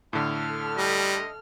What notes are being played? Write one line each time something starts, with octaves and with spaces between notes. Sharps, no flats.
A2 D3 A4 F6
G3 D#5